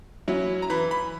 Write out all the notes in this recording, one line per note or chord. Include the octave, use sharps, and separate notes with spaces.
F#3 C#4 E4
A#5
E3 B5
B5